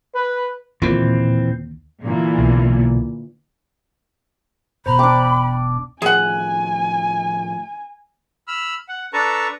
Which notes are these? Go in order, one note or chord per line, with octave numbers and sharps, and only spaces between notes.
B4
D#2 A#2 D3 E3 C4
A#2 D3 E3
B1
E1 B2 C5 A#5 B5
D4 G5 D6
A2 D#3 F3 G#4 F#5 G#5
B5 E6 F6
F#5
D4 A4 B4 A5 A#5 C#6